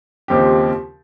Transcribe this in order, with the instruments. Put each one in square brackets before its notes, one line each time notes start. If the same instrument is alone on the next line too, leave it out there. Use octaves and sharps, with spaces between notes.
[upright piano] D#2 C#3 F3 C4 G4